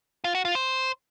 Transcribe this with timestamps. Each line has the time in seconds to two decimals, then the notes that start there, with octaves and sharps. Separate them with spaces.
0.24 F4
0.35 F#4
0.45 F4
0.55 C5